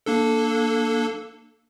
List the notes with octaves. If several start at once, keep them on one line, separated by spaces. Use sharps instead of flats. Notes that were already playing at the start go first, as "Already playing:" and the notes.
A#3 D4 A4